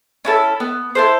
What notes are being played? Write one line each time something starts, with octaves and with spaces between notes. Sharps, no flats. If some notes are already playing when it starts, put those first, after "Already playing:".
C#4 E4 A4
B3
E4 A4 C5